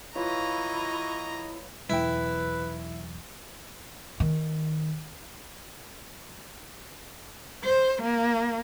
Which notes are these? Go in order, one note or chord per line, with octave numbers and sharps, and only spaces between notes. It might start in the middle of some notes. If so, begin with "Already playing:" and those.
E3 E4 F4 B4 C#5 D#5 A#5 C#6
B1 E2 E4 B4 G5
D#3
C5
A#3